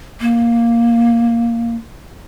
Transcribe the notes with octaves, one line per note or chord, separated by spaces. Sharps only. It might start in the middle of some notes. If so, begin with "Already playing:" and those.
A#3